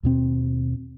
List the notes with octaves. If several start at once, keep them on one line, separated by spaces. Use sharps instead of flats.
D#2 B2 C4